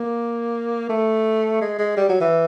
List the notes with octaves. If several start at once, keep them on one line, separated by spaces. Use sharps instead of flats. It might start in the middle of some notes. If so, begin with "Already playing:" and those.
Already playing: A#3
A3
G#3
G#3
G3
F#3
E3